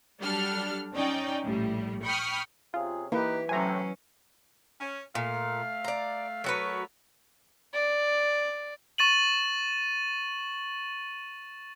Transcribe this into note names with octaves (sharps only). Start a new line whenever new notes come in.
F#3 G3 D4 A4 F6
C#4 D#4 D5 G5
A#1 A2 G3
G5 B5 C#6 D#6 F6
C3 C#4 F4 G#4
E3 A#3 D#4 G4 B4
A2 C3 F#3 C#4 G#5 A#5
C#4
A#2 A3 F5
D5 A#5
F#3 A3 F#4 A#4 B4 C#5
D5
C#6 A6 D#7 F#7